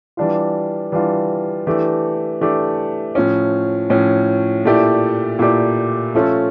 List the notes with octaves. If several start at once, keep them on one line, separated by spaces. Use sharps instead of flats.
E3 G3 D4 F4
E3 G3 D4 F4
E3 A3 D4 G4
E3 A3 D4 G4
A2 F3 C#4
A2 F3 C#4
A#2 A3 E4 G4 D5
A#2 A3 E4 G4 D5
F3 A3 C#4 F4 A4